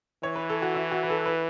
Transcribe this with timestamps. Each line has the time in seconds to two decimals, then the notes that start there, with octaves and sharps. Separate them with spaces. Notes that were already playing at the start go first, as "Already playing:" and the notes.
0.23 E3 C#5
0.36 B4
0.49 A4
0.62 F#4
0.75 E4
0.91 F#4
1.03 B4
1.10 A4
1.26 B4